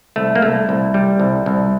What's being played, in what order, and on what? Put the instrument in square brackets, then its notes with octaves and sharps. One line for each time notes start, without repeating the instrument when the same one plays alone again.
[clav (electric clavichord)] C2 A3
A#3
C2 A3
C2
G3
C2
C2